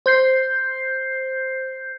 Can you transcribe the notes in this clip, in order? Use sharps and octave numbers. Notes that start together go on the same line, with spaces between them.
C5 G6 C7